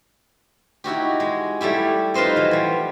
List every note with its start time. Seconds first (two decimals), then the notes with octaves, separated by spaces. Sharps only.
0.84 D#4 E4 F#4 G4
1.20 G#3
1.61 G3 A3 E4 G4
2.14 D#4 F4 B4 C5 D#5
2.36 E3 F#3
2.51 F3 G3